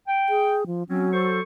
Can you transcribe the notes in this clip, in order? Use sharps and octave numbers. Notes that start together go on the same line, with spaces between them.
G5
G#4
F3
F#3 C4 C#4 F#4
A4 C5 C#6